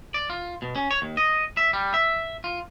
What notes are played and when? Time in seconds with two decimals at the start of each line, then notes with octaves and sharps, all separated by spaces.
0.14 D5
0.30 F4
0.62 B2
0.76 C#4
0.91 C#5
1.02 D#2
1.17 D#5
1.57 E5
1.73 G3
1.94 E5
2.44 F4